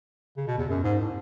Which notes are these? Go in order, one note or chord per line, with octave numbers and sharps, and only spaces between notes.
C#3
B2
E2
F#2
G#2
A2